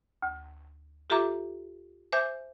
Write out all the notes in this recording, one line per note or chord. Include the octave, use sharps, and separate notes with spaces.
D2
F4 G4 A4 E5 A#5 D6
C5 E5 G#5 D6 G6